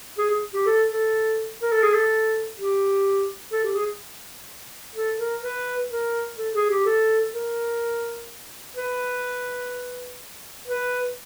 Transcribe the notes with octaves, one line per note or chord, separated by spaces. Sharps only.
G#4
G#4
G4
A4
A4
A#4
A4
G#4
A4
G4
A4
G4
G#4
A4
A#4
B4
A#4
A4
G#4
G4
A4
A#4
B4
B4